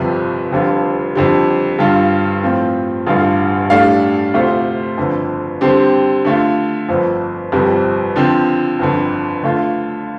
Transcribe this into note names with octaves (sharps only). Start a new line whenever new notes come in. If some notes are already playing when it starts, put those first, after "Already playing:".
Already playing: G1 F2 C3 F3
F1 F2 D3 G3 F4
F2 D3 G3
G2 D3 G3 F4
A2 F3 C4 F4
A1 G2 D3 G3 F4
A2 G3 D4 A4 F5
D2 C3 A3 F4 C5
G1 F2 D3
D3 G3 C4 G4 C5
D3 A3 F4
G1 F2 F3
G1 F2 C3 G3
D3 F3 C4
G1 F2 D3
D3 A3 F4